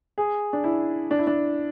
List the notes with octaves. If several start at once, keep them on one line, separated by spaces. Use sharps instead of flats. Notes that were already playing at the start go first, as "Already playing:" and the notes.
G#4
D4
E4
D4
E4
D4